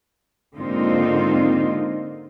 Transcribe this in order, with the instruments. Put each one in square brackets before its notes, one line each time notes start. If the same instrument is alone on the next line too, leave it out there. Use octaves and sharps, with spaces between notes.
[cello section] G#2 D3 A#3 C4 D#4 F4